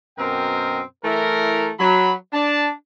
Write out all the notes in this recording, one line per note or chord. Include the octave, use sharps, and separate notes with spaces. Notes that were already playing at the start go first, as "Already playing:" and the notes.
F#2 B2 C4 A#4 D#5 G5
E3 A3 E4 A#4
F#3 B5
D4 D5 A5